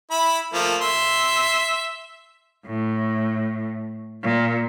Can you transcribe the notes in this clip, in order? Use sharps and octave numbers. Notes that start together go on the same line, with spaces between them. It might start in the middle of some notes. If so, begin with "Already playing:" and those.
E4 B5
F3 A3 A#3
E5 C6
A2
A#2